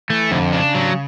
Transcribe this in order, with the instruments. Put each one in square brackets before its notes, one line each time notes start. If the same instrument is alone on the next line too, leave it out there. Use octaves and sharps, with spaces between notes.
[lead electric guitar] E3 [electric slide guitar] A3
[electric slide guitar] F2 [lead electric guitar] D3
[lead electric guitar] C#3 [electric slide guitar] D4
[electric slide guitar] F#3